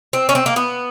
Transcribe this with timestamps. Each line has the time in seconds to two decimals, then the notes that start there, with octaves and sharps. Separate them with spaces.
0.13 C4
0.29 C#4
0.35 C4
0.46 A#3
0.56 B3